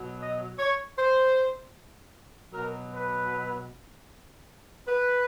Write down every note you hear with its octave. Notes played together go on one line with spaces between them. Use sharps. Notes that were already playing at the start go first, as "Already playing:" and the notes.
Already playing: B2 F#3
D#5
C#5
C5
B2 F#3 A#4
B4
B4